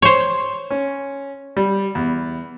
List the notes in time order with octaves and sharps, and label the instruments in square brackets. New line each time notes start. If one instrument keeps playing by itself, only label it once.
[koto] C5 C#5
[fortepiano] C#4
G3
E2